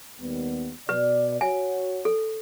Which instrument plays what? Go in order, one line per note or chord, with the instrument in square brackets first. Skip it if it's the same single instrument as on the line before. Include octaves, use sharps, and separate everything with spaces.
[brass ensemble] D#2 G3 B3
[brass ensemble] B2 D5 [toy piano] B4
[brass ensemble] F#4 C#5 [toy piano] G#5
[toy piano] A4